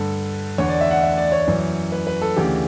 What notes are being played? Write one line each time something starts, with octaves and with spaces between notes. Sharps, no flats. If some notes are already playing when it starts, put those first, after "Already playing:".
Already playing: G2 D3 A4
E2 D3 C#5
D5
E5
F#5
E5
D5
C#5
F#2 E3
B4
B4
A4
D2 C#3 E3 G4